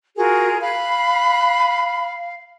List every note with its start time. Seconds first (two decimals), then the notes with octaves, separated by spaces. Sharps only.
0.17 F4 F#4 G#4 A#4
0.61 F5 B5 F#6